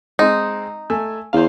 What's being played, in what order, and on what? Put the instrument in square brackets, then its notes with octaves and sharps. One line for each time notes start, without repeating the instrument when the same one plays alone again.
[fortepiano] G#3 C4 [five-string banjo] D#4
[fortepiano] A3 G#5 E6
[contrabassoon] E2 [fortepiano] C5 F5